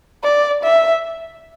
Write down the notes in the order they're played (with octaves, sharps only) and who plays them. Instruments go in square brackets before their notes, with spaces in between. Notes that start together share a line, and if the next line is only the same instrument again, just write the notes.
[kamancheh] D5
E5